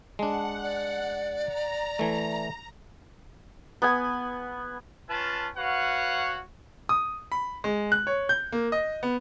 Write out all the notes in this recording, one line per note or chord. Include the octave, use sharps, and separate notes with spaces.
G#3 D4 F#5 A5
D5
A#5
E3 A3
B3 G#5
C#4 F4 B4 A5
F#4 B4 C#5 F5 F#5
D#6
B5
G#3
F#6
C#5
G6
A#3
D#5
B3